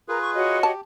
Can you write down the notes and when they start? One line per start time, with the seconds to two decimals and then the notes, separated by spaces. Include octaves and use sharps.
0.08 F4 G#4 A#4 B4
0.22 C#6
0.35 F#4 C#5 D#5
0.63 G4 A5